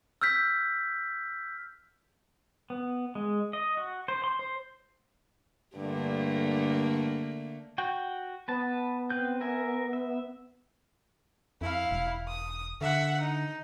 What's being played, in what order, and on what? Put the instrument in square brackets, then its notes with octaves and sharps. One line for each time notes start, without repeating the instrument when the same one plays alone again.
[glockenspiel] E6 F6 G6 B6
[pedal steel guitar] B3
G#3
D#5
F#4
C5
C6
C5
[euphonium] G2 [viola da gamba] D3 A3 A#3
[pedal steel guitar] F#4 G5
[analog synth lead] B3 [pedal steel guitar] B4 A5
[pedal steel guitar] C4 B4 G6
A#4 E5 G#5
E5
[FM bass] F2 [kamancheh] E4 F5
[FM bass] E1
[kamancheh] D#6
[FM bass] D3 [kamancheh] E5 F#5
[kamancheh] D#4